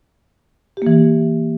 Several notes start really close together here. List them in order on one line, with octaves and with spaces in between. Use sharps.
G4 A#3 E3